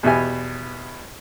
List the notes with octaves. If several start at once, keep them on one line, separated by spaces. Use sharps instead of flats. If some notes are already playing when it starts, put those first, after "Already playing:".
E2 B2 E4 G4 G#5